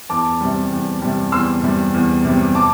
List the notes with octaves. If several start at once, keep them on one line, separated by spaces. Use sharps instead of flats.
E2 A5 D6
C3 G3
E2
C3 G3
E2 C6 E6
C3 G3
E2
C3 G3
A5 D6